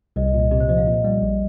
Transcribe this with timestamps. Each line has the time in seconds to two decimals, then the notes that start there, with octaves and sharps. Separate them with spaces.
0.16 C2 D#5
0.28 D#5
0.34 A#2
0.39 D#5
0.51 C3 D#5
0.60 C5
0.69 F3 D#5
0.78 F5
0.86 A#2 D#5
1.04 G3
1.22 A#1